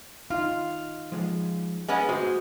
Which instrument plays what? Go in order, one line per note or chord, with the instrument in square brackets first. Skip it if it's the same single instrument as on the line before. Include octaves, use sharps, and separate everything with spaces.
[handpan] D#4 [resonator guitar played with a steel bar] F4
[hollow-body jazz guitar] F3 G#3
[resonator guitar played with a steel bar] G#3 B3 C#4
[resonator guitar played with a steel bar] G#3 [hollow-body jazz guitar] F#4 G4 C5